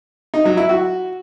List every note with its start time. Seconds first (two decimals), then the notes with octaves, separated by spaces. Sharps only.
0.34 D#4
0.45 F#3
0.57 E4
0.69 F#4